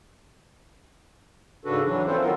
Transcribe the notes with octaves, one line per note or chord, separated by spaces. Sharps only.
G#2 C#3 D4 F#4 A4 B4
E3 F#3 D4
C4 C#4 E4 F4 A4 C5
D#3 F#3 B3 F4 A4 A#4